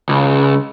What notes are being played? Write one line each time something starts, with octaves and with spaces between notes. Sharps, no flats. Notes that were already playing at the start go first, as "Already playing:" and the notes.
C#2